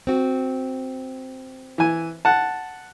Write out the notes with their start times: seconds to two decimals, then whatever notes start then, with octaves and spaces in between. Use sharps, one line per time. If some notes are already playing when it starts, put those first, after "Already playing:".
0.07 C4 F#4
1.78 E3 G#5
2.25 F#5 A5